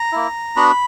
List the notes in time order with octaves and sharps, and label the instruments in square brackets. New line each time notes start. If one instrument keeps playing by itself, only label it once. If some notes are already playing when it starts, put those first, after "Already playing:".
Already playing: [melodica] A#5
A#3 E4
B3 D4 F#4 B5